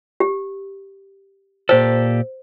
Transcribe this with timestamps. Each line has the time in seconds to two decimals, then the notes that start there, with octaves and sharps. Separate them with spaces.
0.20 G4
1.69 A#2 G4 A4 C5